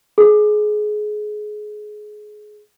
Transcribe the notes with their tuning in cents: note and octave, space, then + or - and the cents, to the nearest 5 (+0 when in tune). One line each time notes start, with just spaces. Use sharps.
G#4 +25